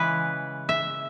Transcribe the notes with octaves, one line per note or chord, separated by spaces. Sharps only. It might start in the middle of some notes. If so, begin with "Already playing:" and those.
Already playing: C#3 E3 G#3 B4
E5